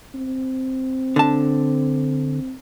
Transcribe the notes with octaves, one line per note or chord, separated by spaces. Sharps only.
C4
D3 A5